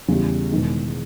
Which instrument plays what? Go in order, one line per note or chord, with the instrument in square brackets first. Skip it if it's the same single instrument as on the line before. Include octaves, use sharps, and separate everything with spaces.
[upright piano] E2 C#3 G3
E1 E2 D#3 G#3